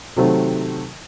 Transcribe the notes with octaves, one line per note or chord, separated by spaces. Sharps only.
C3 D#3 F#3 A3 C4